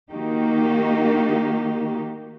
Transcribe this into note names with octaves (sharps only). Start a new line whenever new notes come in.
D#3 A#3 D#4 F#4 G4